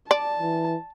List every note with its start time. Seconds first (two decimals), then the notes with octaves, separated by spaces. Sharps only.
0.11 D5 A5
0.40 E3